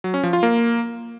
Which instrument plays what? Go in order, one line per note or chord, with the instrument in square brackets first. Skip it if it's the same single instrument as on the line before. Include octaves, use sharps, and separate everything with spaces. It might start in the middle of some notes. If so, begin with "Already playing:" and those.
[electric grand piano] F#3
C#4
F3
F4
A#3